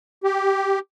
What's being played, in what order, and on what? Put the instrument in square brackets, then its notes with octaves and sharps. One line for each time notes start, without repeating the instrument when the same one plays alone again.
[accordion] G4